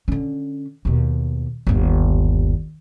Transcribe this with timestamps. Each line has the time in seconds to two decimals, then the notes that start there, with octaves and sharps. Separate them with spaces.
0.08 D3 C#4
0.85 D#2 B2
1.67 G1 D#2